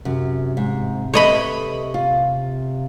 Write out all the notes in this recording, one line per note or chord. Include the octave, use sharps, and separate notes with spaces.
F#2 C3
G#2
A4 B4 C#5 D#5 E5 B5
F4